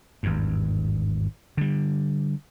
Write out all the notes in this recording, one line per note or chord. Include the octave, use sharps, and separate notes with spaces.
G#1 E2 G2
D3 G3